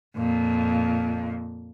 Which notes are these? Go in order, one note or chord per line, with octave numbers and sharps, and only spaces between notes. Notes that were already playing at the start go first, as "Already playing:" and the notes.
F2 A#2